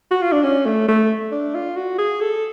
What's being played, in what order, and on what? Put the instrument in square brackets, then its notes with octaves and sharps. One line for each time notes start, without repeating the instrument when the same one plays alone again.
[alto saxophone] F#4
F4
D4
C#4
A3
A3
D4
F4
F#4
G#4
A4